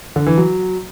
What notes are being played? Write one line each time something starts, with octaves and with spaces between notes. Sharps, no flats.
D3
E3
F#3